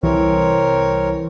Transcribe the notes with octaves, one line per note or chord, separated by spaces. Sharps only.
C2 E3 C4 A#4 C#5